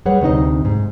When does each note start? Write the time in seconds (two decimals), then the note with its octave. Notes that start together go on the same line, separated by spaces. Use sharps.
0.05 G3 G#4 B4 C#5 F#5
0.21 D2 C3 D#4 D#5
0.65 G#2